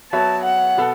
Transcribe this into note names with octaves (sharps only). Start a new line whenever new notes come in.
F#3 B3 F#4 C#5 E5 A5
F#5
B2 B3 A4